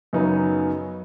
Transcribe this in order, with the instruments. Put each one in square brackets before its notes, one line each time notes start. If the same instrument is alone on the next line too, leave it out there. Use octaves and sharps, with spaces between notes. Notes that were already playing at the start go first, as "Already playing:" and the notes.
[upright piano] F#2 C#3 F#3 B3 D#4